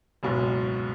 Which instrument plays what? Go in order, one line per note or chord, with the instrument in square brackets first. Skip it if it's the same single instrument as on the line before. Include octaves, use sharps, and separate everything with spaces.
[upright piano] F#1 C#2 G#2 B2